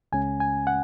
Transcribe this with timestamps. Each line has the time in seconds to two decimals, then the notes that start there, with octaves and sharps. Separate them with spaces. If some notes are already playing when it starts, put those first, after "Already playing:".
0.12 C#2 C#3 G#3 C#4 G#5
0.40 G#5
0.67 F#5